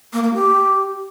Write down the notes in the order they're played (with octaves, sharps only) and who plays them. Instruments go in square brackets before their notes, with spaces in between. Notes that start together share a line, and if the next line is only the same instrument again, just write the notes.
[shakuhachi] A#3
A#3
G4